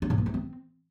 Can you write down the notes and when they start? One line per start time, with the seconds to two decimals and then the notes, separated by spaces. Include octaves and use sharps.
0.02 D4
0.10 G#2
0.18 A#3
0.26 E3
0.34 C4